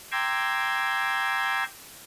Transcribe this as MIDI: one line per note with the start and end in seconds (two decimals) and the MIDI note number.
0.12 1.64 79
0.12 1.64 82
0.12 1.64 84
0.12 1.64 86
0.12 1.64 88
0.12 1.64 92